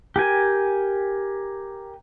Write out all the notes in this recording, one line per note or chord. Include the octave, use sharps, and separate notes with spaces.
G4 A#4 G#5